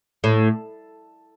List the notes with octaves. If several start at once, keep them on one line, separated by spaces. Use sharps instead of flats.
A2